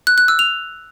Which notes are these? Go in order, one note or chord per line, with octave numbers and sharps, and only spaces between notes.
F#6
F#6
E6
F7